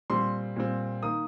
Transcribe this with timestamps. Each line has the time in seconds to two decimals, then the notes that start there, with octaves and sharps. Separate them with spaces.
0.10 A#2 G3 C4 C6
0.56 A#2 G3 C4
1.03 D#3 A#3 D#6